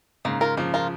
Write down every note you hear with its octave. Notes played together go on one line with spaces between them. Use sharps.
G#2 C#3 A#3
F4 A#4
C#3 F3 A#3
F4 A#4